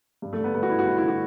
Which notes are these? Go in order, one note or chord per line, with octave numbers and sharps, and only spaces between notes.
G2
A3
D3
B3
G2 B3
F#4
D3 E4
F#4
G2 E4
D3 E4
F#4